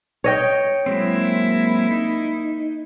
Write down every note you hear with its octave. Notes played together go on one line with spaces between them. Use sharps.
C#5 D#5 G5
F#3 G#3 A#3 C4 E4
D#4